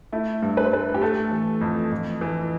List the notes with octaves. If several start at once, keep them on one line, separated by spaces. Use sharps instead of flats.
A3 E4
G2
B4
C5
A3 B4
G4
A3 A4
E3
F2
F2
E3